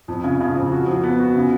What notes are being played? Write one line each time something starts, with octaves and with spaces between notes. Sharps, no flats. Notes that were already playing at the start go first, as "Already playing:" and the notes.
F2
C#3
C#3
F2
F#4
F3
B3
F#4
C#3